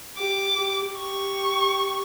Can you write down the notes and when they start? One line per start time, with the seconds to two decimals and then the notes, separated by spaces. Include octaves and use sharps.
0.18 G4 D6
0.57 G4
0.97 G4 C#6